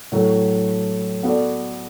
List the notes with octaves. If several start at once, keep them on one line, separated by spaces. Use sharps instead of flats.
A2 F#3 A3
B3 F#4 A4 D5